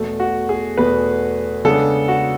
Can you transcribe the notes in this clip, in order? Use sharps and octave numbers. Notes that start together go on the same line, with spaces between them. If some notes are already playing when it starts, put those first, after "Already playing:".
Already playing: E2 B2 A3
F#4
G#4
E2 B2 A3 B4
C#3 G#3 B3 D4 A4
F#4